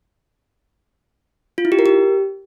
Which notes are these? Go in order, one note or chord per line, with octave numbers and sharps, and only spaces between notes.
F4
E4
G4
A#4
G4